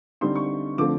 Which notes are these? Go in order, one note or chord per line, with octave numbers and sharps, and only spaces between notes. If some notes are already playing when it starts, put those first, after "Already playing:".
D3 G3 C4 D#4 C6
C#6
D3 F3 A3 C4 D6